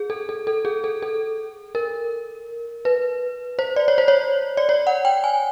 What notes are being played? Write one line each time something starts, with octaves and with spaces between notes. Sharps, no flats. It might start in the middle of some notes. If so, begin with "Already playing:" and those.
Already playing: G#4
A4
A4
A4
G#4
A4
A4
A#4
B4
C5
D5
C#5
C5
C#5
D5
C#5
F#5
G5
G#5